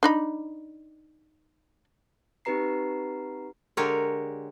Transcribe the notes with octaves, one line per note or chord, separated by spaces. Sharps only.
D4 D#4 B5
C4 D#4 G4 B4 A#5 C7
D3 G#3 G4 A#4 C#5